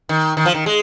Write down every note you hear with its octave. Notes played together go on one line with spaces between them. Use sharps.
D#3
D#3
F3
D#3
G#3